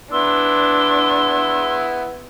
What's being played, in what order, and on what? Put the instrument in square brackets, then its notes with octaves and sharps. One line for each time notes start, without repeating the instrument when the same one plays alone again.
[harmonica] B3 E4 [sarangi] D4 [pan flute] C6 [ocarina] E6